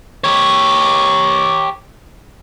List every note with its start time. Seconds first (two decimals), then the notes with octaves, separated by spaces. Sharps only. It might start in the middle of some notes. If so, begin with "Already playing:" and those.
0.24 G4 C#5